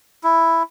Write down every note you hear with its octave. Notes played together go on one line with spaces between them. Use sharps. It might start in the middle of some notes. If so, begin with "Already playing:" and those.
E4